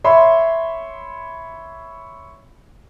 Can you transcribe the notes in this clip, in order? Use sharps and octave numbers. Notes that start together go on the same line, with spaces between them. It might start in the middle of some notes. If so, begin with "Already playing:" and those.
C#5 E5 B5 C6